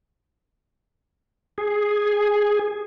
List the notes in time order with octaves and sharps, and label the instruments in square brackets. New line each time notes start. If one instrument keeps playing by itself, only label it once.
[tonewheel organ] G#4